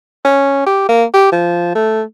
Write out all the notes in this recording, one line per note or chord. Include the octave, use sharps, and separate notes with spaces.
C#4
G4
A#3
G4
F3
A3